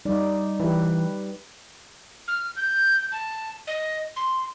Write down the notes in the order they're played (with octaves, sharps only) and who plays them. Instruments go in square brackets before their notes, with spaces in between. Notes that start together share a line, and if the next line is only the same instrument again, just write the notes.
[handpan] G3 D#4 D5
[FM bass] E3 [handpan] G4 B4
[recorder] F6
G6
A5
D#5
C6